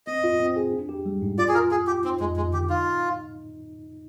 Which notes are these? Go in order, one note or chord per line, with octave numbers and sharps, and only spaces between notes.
C4 D#5
F4
C4
G#4
D4
G4
G3
G#2
F4 D5
G#4
F4 A#4
F4 G#4
F4 G4
C4 D#4
F2 G#3
F2 G#3
D3 G4
D#4 F4